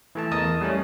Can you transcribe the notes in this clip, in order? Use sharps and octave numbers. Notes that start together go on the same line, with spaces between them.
E3 A3 A5
E2 A#4 D#5 A5 D#6
G3 A3 C#4